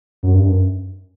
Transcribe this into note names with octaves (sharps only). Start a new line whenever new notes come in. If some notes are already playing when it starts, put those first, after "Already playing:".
F#2
G2
F#2